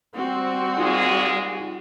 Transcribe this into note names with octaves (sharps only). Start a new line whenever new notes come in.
G3 C4 F#4
A#2 G#3 D#4 F4 G#4